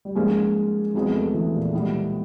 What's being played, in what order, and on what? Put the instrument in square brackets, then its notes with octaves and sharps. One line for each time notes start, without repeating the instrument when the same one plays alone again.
[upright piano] G3
[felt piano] G#2 F3 A#3 C#4 [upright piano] G#3
[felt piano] E2 C3 F3 G#3 B3 [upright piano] F#3
[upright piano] A3
E3
A#2
[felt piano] C#2 B2 G3